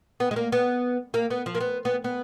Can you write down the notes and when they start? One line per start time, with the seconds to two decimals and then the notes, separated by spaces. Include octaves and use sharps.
0.20 B3
0.31 G#3
0.36 A#3
0.52 B3
1.14 A#3
1.30 B3
1.46 F3
1.55 A#3
1.60 B3
1.85 B3
2.04 B3